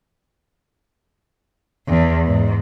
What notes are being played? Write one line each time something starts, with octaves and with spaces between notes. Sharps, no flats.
E2
G#2